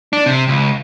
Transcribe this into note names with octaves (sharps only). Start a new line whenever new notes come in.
D4
C3
C#2